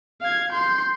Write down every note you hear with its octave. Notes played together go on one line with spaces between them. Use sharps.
F5 G#6
C6 G6